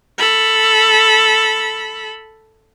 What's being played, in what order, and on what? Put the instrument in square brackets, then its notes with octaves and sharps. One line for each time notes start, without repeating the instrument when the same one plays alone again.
[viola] A4 B5